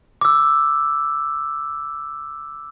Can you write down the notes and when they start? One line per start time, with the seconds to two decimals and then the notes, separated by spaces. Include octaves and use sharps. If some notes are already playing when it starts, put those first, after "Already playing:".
0.21 D6 E6